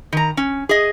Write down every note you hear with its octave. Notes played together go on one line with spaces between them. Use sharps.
D#3 A#5
C#4
G#4 D#5